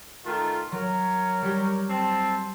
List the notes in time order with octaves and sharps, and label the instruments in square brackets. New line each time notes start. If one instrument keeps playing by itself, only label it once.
[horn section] D#3 A3 F4
[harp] F#3 [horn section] A#4 C#5
[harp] G3 G4
[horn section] C4 A5